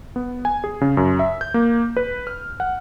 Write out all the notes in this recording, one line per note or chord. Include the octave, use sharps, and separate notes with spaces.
B3
G#5
G#4
C#3
F#2
E5
G6
A#3
B4
F6
F#5